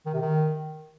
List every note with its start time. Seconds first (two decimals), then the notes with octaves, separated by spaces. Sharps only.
0.06 D#3
0.13 C3
0.21 D#3